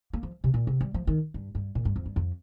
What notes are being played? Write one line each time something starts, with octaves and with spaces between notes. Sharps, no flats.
A#3
F3
C3
A#2
C3
G3
F3
D#3
G2
G2
A#2
G2
F2
G2
F2